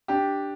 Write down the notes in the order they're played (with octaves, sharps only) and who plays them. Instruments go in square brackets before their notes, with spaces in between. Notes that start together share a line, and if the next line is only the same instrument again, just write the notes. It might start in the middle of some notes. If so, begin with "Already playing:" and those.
[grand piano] D4 G4